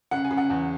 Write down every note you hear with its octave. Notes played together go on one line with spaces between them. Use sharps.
C#3 F#5
G#5
C#3
F#5
E2